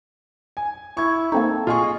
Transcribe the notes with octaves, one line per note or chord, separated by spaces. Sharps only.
G#5
E4 C#6 G#6
A#3 C4 D#4 A4
A#2 F4 G#4 D#5 C#6